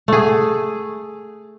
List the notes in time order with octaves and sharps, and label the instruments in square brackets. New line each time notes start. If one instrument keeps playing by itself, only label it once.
[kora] A3 G#4